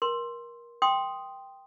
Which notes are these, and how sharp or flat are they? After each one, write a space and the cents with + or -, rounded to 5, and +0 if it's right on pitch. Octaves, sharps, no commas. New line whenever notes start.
A#4 +25 C6 +10
G5 +0 C6 +0 D#6 +0